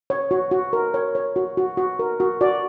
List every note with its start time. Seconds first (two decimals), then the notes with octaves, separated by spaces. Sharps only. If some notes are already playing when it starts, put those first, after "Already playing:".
0.10 C#5
0.31 F#4 C#5
0.51 F#4
0.73 A#4
0.94 C#5
1.15 C#5
1.36 F#4
1.57 F#4
1.77 F#4
1.99 A#4
2.20 F#4
2.41 F#4 D5